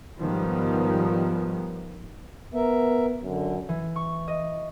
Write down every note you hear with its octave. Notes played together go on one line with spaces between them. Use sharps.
G#2 D#3 F3 G3 B3
B3 A#4 E5
F#2 D3
E3
C#6
D#5